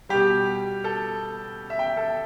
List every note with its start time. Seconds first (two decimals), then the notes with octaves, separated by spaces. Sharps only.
0.09 B2 G3 G4
0.84 A4
1.70 E5
1.79 G5
1.97 A4